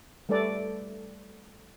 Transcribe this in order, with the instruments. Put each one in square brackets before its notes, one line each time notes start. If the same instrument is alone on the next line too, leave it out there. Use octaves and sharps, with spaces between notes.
[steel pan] G3 A3 A4 B4 D5